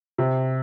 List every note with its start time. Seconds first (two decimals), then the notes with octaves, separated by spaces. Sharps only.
0.18 C3